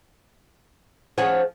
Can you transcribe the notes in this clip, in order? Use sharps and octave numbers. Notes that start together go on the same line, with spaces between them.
F3 C#4 G#4 C#5 F#5